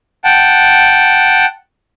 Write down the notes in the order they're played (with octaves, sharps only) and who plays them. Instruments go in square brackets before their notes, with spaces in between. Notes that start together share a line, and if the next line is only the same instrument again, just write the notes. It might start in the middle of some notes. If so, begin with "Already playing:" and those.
[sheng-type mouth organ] F#5 G5 A5